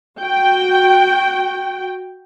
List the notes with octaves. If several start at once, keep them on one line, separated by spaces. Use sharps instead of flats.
F#4 G5